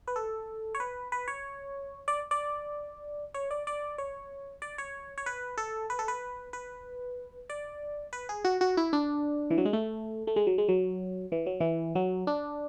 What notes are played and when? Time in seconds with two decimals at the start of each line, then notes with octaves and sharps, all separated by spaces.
0.08 B4
0.16 A4
0.75 C#5
0.80 B4
1.12 B4
1.28 C#5
2.08 D5
2.31 D5
3.34 C#5
3.51 D5
3.67 D5
3.98 C#5
4.62 D5
4.78 C#5
5.18 C#5
5.26 B4
5.58 A4
5.90 B4
5.99 A4
6.08 B4
6.53 B4
7.50 D5
8.13 B4
8.29 G#4
8.45 F#4
8.61 F#4
8.77 E4
8.93 D4
9.50 E3
9.58 F#3
9.65 G#3
9.73 A3
10.27 A3
10.36 G#3
10.47 F#3
10.58 G#3
10.69 F#3
11.32 E3
11.46 F#3
11.60 E3
11.95 F#3
12.27 D4